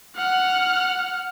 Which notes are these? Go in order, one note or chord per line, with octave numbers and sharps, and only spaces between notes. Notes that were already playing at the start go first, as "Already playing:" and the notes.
F#5 F6